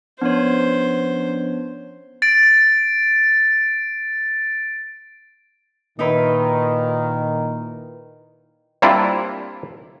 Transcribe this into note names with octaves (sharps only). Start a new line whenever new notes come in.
F3 B3 C#4 D4 C5 C#5
A6 D7
A#2 D#3 D#4 E4 B4
G3 A#3 C4 D4 E4 F4